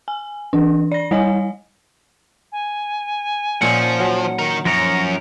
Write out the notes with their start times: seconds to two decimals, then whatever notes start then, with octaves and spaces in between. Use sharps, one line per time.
0.08 G#5
0.53 E3 D4
0.92 D5 A#6
1.11 G3 C#5 D#5 G#5
2.52 G#5
3.62 A#2 F3 C#4 D#4 F#5
4.00 F#3
4.39 D#3 A#4 C#7
4.65 F#2 F3 A#4 C#5 A#6